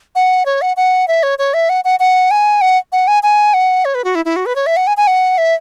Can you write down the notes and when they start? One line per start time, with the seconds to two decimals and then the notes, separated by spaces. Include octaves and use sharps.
0.15 F#5
0.46 C#5
0.62 F#5
0.77 F#5
1.08 E5
1.23 C#5
1.39 C#5
1.54 E5
1.69 F#5
1.84 F#5
2.00 F#5
2.31 G#5
2.61 F#5
2.92 F#5
3.07 G#5
3.23 G#5
3.54 F#5
3.85 C#5
3.95 B4
4.04 F#4
4.15 E4
4.25 E4
4.36 F#4
4.46 B4
4.56 C#5
4.66 E5
4.77 F#5
4.87 G#5
4.97 G#5
5.07 F#5
5.38 E5